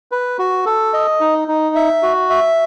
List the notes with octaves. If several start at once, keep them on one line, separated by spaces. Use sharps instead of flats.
B4
F#4
A4
D#5
D#4
D#4
E5
F#4
E5